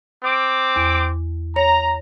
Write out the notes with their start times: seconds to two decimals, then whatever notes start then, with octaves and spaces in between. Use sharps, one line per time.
0.24 C4 D6
0.76 E2
1.56 C#5 A#5